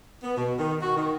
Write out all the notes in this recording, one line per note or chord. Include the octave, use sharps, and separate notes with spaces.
B3
B2
D#3
F#4
D#3